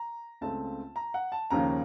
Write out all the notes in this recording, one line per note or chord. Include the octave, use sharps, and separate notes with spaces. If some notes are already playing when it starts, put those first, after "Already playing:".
Already playing: A#5
C#2 C#3 A3 C4 A5
A#5
F#5
A5
D#2 C#3 F3 A#3 C#4 A#5